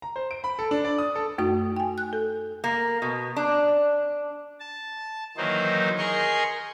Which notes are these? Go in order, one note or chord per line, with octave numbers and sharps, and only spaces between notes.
A#5
C5
D7
B5
A4
D4
D5
D#6
A4
F#2 A3 D#4 F#4 D#6
G5 G#5
F#6
A4
A#3
B2
D4
A5
D#3 E3 F#3 A#3 D#4 C5
G#4 A#4 D#5 G#5 C6 C#6